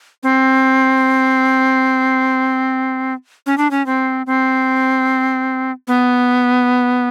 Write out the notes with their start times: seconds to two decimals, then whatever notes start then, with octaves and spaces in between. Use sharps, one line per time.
0.23 C4
3.46 C#4
3.57 D4
3.71 C#4
3.86 C4
4.26 C4
5.87 B3